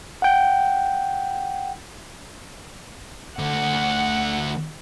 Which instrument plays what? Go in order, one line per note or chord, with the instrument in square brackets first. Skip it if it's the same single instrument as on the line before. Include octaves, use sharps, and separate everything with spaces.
[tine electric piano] F#5 G5
[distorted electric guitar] D2 D3 [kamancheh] F#5